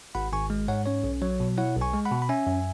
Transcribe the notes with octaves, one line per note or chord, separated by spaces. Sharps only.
G#1 F#5 B5
G#1 G#5 C#6
G#3
G#2 C#5 F#5
C#4 C#5
B1
F#3 C#5
B2
E4 C#5 F#5
B1
G#5 C#6
G#3
F#5 B5
B2
B5
C#4 E5 G#5
F#2